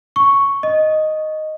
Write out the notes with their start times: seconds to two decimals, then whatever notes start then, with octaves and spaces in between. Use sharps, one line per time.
0.16 C#6
0.63 D#5